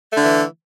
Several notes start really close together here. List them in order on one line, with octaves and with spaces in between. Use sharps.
A3 D3 E3